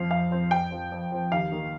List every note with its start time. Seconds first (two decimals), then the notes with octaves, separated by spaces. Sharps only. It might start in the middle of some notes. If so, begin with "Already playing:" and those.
Already playing: F2 F3 C4 F5
0.11 F2 F5
0.31 F3 C4
0.51 F2 G5
0.71 F3 C4
0.92 F2
1.12 F3 C4
1.32 D#2 F5
1.52 D#3 A#3